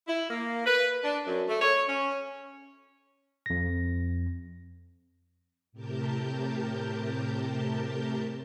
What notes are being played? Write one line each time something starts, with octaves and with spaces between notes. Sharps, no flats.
E4
A#3
B4
D4
F#2
A3
C#5
C#4
F2 A#6
A2 C3 G4 A#4 A5 G6